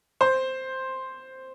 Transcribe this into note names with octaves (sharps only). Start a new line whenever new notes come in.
C5